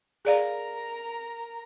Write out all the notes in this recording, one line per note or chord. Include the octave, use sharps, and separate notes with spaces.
G#4 A#4 D5 F5 A#5